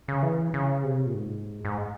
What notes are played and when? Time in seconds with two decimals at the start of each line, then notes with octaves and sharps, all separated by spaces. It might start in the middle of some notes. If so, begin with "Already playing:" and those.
0.08 C#3
0.22 E3
0.54 C#3
0.84 C3
1.06 A#2
1.14 G#2
1.65 G#2